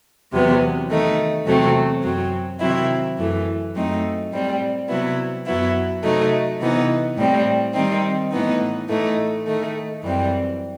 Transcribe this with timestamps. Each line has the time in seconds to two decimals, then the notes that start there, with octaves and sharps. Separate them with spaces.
0.32 E2 C3 F#3 B3
0.88 D#3 A3 D#4
1.46 E2 C3 F#3 A3 C4
2.03 F#2 F#3 C4
2.59 C3 D#3 F#3 C4 E4
3.17 F#2 E3 A3
3.74 F#2 F#3 A3 C4 D#4
4.31 A2 G3 C4
4.89 C3 F#3 B3 E4
5.46 F#2 F#3 B3 E4
6.03 C3 F#3 A3 D#4
6.60 C3 E3 B3 D#4
7.17 A2 G3 C4
7.74 D#3 G3 C4 D#4
8.31 A2 E3 B3 D#4
8.88 A2 E3 A3 D#4
9.45 D#3 A3 D#4
10.02 F#2 E3 G3 C4